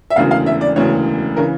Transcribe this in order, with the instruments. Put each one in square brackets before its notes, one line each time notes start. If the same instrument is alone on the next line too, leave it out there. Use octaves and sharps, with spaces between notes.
[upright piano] E5
E1 D2 C#3 E3 F5
F5
E5
D5
E1 D2 C#3 E3 C#5
C#3 E3 A#4